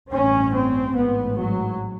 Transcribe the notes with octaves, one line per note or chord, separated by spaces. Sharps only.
A1 G2 C#4
C4
A1 G#2 B3
F#3